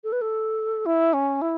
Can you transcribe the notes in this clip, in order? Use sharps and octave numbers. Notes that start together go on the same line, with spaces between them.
A4
B4
A4
E4
C#4
E4